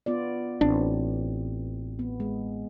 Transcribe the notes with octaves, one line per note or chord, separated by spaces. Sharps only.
B3 F4 D5
A1 C4 D4
B3
G#3